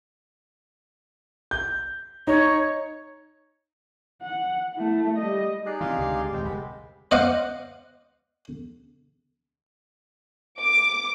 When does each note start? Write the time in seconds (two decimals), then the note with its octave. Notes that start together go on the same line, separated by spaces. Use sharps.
1.51 G6
2.27 D#4 C#5
4.22 F#5
4.75 A3 E4
5.17 G3 D#5
5.66 D#4 G4 G#4 D5 F#6 C7
5.81 C3 E3 F5 C6
5.98 C#2 D3 G4
6.33 D#1 G#3 C4 G5
6.45 C2 B5
7.11 C5 D#5 F5 F#5 D6
10.62 D6